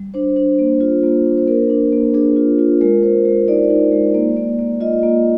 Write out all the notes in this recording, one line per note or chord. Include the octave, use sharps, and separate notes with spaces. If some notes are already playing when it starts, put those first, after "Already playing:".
Already playing: G3
D4 C5
D4
A#3
F4
A#3
D4
C5
A#3 A#4
D4
A#3
D4 G#4
F4
F4
G#3 A#4
G#3 C5
G#3
D#4 D5
D#4
G#3
A#3
A#3
A#3
F4 D#5
A#3